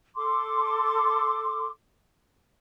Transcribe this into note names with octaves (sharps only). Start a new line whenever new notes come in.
A4 C6 D6